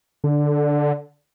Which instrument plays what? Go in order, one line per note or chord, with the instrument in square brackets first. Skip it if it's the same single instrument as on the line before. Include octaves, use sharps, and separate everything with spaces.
[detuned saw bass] D3